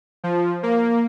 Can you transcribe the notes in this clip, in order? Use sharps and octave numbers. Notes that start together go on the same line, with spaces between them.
F3
A#3